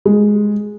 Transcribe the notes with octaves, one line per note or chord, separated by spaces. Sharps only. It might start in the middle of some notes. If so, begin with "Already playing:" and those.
G#3